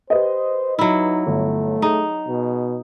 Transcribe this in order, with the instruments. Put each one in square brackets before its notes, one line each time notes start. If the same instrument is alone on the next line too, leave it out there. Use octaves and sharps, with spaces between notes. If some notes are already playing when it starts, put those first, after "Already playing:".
[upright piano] G4 B4 D#5 [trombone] C5
[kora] F#3 E4 [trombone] D#4
[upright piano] G1 [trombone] A3
[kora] D#4 [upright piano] G#4
[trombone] B2